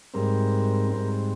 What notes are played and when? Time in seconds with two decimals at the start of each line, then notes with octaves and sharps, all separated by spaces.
0.14 G#2 G3 C4 A#4
0.92 G#2 G3 C4